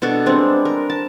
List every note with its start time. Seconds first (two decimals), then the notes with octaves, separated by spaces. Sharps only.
0.02 B2 D4 F#4 A4
0.26 G3 G#3 C4 D4
0.65 A#4
0.90 A5